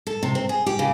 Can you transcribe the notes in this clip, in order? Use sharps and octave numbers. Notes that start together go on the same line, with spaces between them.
A4
C3
C4
G#4
G4
C#3